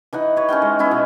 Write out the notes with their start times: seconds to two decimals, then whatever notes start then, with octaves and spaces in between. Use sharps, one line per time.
0.13 E3 D#4 F#5
0.36 B4 C#5
0.49 C#4 A#4 F#5 G5
0.62 G#3
0.79 B3 C#4 E4
0.91 B2